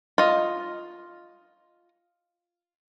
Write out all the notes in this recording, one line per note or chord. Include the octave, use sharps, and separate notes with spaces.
F4 D#5